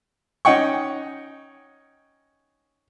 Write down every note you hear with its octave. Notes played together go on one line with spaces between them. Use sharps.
C#4 D#4 F#5 G5 C#6